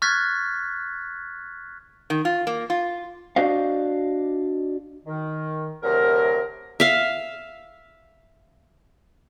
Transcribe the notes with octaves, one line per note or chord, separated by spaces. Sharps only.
C#6 F6 F#6 G#6 A6 B6
D#3
F4
A#3
F4
D4 F#4 C5 D5 D#5 F5
D#3
D2 C3 F#3 A#4
E5 F5